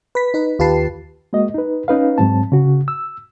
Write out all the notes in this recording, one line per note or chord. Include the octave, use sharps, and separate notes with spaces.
B4 B6
D#4 B4
D#2 F4 G4 B4 A5 C7
G#3 A#3 F#4 D#5
D#4 B4
C#4 D#4 B4 F5
G#2 F#3 C4 A5
C#3 F#4
E6